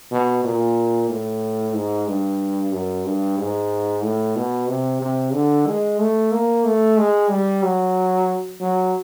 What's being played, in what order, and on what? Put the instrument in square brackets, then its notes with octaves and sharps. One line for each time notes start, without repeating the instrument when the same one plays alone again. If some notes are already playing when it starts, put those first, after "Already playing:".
[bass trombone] B2
A#2
A2
G#2
G2
F#2
G2
G#2
A2
B2
C3
C3
D3
G#3
A3
A#3
A3
G#3
G3
F#3
F#3